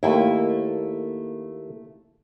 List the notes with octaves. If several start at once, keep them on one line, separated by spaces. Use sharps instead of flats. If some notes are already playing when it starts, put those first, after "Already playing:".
D#2 A3 A#3 E4